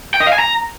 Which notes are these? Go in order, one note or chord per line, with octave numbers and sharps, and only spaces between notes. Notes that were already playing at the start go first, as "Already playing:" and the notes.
G5
D#5
F5
G#5
A#5